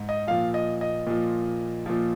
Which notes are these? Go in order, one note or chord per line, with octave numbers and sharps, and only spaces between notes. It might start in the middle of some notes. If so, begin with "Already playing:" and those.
Already playing: G#2
D#5
A#2 F3 F5
D#5
D#5
A#2 F3
A#2 F3